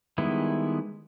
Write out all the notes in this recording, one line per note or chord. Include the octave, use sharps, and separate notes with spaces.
D#3 G3 G#3 B3 E4